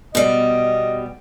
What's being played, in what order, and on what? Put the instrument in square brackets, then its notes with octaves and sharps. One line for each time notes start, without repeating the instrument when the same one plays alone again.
[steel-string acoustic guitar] B2 G3 [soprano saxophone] D#5